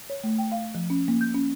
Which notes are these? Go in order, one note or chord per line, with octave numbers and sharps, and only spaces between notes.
C#5
A3
G5
F5
F3
C#4
A#3
G6
C#4